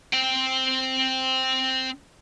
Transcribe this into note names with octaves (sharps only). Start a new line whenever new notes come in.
C4 G5